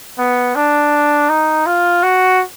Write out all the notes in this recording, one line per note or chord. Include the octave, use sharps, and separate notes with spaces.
B3
D4
D#4
F4
F#4